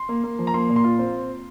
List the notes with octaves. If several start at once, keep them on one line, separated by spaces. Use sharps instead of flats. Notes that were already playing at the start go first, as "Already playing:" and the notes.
Already playing: C6
A#3
A#3
F3
A#5
A#3 C6
A#2
C6
F4
C4